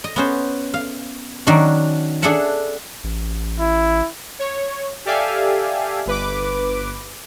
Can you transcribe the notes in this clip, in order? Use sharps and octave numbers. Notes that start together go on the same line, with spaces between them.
D#5
B3 C#4 C5
F5
D#3 F#3 C#4 D4
D4 G#4 A4 E5 F#5 A5
A1
E4
C#5
G4 A4 D5 E5 F5 G#5
G1 B4 D6